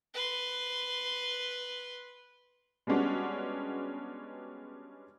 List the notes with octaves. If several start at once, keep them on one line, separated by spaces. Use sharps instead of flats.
B4 C6
G3 G#3 B3 C#4 D4 F#4